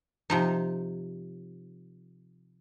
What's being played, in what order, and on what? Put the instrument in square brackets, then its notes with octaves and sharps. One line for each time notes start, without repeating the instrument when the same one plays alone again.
[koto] C3 F3 D#4